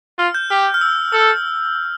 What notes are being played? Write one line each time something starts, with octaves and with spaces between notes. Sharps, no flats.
F4 F6
G6
G4 F6
F6
E6
A4 E6